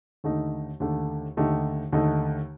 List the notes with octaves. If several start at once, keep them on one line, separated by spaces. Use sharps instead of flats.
D#2 D3 A3 D#4
D#2 D3 A3
D#2 D3 A3 D#4 G4
D#2 D3 A3 D#4